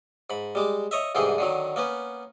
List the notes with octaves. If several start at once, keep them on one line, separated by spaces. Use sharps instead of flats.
G#2 B5
G3 G#3 D6
C#5 D#5 E5
C2 G#2 D3 E3 G#4 G5
D3 D#3 F#3
A#3 B3 C#4 B4